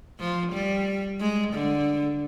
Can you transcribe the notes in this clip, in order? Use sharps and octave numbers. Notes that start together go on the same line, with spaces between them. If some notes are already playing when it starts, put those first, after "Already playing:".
F3
G3
G#3
D3